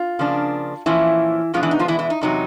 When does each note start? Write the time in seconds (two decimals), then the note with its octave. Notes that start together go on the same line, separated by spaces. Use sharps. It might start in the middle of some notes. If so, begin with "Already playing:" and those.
Already playing: F4
0.19 C#3 F3 A#3 D4
0.86 A#2 E3 F3 A#3 C#4 E4
1.54 B2 F3 G#3 B3 D4 F4
1.63 E3 E4
1.71 D#4
1.79 F3 F4
1.88 E3 E4
1.99 E3 E4
2.10 D#4
2.21 E2 C3 F#3 D#4